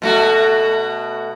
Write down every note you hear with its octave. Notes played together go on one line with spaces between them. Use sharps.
B2 A3 F#4